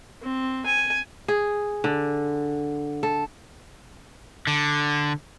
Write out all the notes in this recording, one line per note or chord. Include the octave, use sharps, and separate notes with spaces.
C4
G#5
G#4
D3
A4
D3